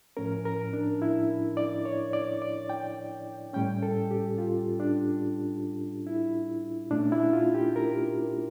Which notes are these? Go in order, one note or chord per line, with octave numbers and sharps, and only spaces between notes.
A2 F3 C#4 A#4
A#4
D4
E4
D5
C#5
D5
D5
G5
A2 G3 C#4 G5
A4
G4
F4
D4
E4
A#2 A3 C#4 D4
E4
F4
G4
A#4